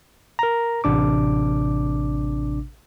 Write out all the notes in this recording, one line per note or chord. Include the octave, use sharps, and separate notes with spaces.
A#4 A#5
A1 C3 D4 D6